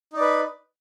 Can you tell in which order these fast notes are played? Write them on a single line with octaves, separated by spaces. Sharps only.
D#4 D5 B4